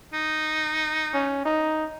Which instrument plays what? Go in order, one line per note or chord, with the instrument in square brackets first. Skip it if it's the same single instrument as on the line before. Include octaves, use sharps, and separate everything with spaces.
[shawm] D#4
[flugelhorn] C#4
D#4